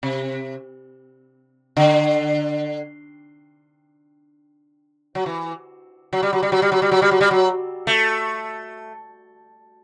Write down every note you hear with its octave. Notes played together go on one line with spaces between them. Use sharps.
C3
D3
F#3
E3
F#3
G3
F#3
G3
F#3
G3
F#3
G3
F#3
G3
F#3
G3
F#3
A3